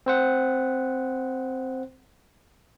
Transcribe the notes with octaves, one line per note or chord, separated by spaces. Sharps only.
C4 C5 F#5